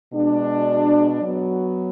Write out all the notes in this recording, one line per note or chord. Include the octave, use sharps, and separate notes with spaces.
B2 G#3 D4 F#4
F#3 B3 F#4